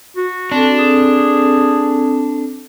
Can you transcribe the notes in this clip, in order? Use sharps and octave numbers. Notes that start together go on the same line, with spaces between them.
F#4
C4 D4 A4
G#4